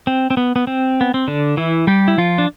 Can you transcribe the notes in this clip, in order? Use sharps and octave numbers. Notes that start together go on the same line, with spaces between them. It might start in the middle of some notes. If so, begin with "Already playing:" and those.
C4
C4
B3
B3
C4
B3
C4
D3 D4
E3 E4
G3 G4
E4
F3 F4
D4